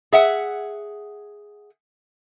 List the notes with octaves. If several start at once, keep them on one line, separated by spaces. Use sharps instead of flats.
G#4 E5 F#5